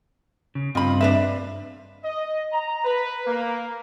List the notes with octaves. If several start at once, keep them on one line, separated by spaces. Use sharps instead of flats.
C#3
G2 C4 F4 D#5 B5
D4 B4 E5
D#5
A#5
B4
A#3